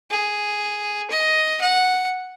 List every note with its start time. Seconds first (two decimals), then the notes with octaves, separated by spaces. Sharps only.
0.11 G#4
1.10 D#5
1.61 F#5